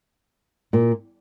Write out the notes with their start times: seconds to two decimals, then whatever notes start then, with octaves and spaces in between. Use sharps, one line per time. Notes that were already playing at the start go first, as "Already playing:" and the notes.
0.73 A#2